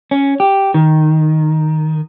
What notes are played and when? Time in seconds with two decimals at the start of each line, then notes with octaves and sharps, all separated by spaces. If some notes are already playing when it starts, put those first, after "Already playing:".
0.11 C#4
0.40 G4
0.74 D#3